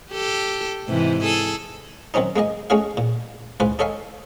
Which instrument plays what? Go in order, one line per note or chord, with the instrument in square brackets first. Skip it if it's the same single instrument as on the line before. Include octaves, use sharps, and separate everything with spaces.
[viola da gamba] G4 A4
G#2 C3 E3
G#4 A4
[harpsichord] D#3 F#3 C4 C#4 D#4
G#3 A#3 G#4 D#5
G#3 A3 C#4 F#4 G#4 F5
A#2
C#2 G#2 F4 B4 G#5
D#4 A4 C#5 E5 F5 G#5